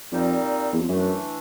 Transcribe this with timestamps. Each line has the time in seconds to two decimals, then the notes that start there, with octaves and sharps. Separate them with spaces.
0.12 F2 A#2 G3 C4 D#4
0.73 E2
0.81 F2
0.88 F#2 E3 A3 D4